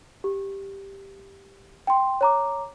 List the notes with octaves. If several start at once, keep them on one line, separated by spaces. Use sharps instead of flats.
G4
G5 C6
C#5 A#5 D6